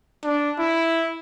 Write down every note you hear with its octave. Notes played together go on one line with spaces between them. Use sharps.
D4
E4